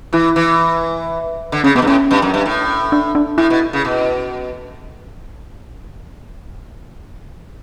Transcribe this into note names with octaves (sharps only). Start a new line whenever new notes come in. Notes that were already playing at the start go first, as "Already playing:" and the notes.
E3 E4
E3
D3
C#3 C#4
B2 B3
G2
A2 C#4
G2
F#2
G2
A2
D4
D4
A2 E4
B2
C#3
B2